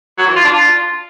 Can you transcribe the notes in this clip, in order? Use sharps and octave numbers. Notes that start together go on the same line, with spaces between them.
F#3
E3
F4
D4
F4